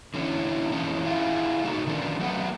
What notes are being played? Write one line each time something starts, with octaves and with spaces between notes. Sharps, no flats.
D3 E3 C4 C#4 E4
E3 F3 G#3 C#4
E4 F4 G#4
A2 C#3 D#4 F#4 A4
D3 D#3 F3 B3 C#4 D5
F#3 A3 B3 B4 F#5